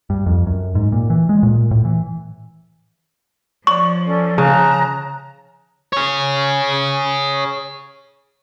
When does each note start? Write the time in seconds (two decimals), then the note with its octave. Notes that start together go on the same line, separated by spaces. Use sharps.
0.10 G2
0.26 F2
0.47 F#2
0.75 G#2
0.92 A#2
1.10 E3
1.29 G#3
1.43 A#2
1.71 A2
1.85 E3
3.67 F3 C#5 D5 C#6
4.06 C#4 A4 D5
4.38 C#3 A5 A#5 F#6
5.93 G#4 C#5